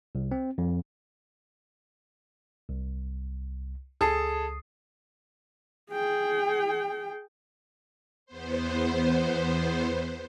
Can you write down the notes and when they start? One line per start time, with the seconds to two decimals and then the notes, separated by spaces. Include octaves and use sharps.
0.15 C2
0.31 C4
0.58 F2
2.69 C2
4.01 C#2 G#4 A4 A5 D#6 C7
5.92 G#4 G5
8.26 E2 B3 C5